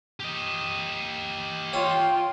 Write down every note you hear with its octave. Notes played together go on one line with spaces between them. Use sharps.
G4 D#5
F4 C#5 G5